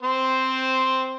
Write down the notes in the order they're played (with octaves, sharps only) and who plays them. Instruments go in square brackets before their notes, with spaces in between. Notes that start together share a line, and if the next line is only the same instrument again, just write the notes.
[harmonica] C4 C5 C6